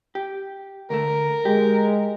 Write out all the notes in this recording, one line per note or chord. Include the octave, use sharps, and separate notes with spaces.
G4
D2 A3 A#4
G#3 G4